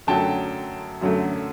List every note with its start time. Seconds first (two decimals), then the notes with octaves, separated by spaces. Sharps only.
0.07 F#2 D3 F#3 A3 G5 A5
1.01 F#2 D3 F#3 A3